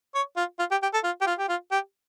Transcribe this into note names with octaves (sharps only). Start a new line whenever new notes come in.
C#5
F4
F4
G4
G4
A4
F4
G4
F4
G4
F4
G4